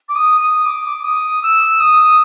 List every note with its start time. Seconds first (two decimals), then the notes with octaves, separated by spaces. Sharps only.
0.09 D6
0.15 D#6
0.41 D#6
0.66 D6
1.04 D#6
1.43 E6
1.80 D#6